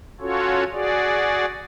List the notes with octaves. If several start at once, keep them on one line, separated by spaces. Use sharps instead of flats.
C#4 F4 F#4 A4 C#5
F#4 G#4 D5